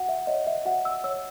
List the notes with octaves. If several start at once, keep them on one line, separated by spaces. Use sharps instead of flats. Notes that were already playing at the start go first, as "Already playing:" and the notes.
Already playing: F#4 F#5
E5
C#5 D#5
E5
F#4 F#5
E6
C#5 E6